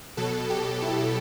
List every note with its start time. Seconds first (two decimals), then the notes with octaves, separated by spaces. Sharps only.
0.17 B2 F#3 A4
0.50 G4
0.82 E4